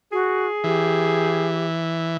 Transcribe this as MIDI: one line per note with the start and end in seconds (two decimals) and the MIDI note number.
0.12 0.47 66
0.12 1.63 68
0.64 2.17 52
0.64 1.65 67